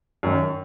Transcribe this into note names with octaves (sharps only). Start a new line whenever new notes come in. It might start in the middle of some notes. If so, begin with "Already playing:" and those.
F#2 D#3